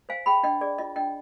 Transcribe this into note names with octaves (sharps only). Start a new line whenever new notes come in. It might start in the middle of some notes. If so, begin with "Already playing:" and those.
C5 F5 G#5
G#4 G5 B5
D4 D#5 G5
G#4 D5
F4 D#5
D4 D#5 G5